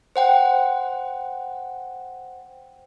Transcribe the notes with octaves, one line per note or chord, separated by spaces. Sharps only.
C5 F#5 G5